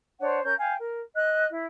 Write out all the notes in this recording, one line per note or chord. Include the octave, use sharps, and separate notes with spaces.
D4 C5 C#5 F#5
C#4 A#4 G6
F5 G5 G#5
A#4
D#5 F#6
E4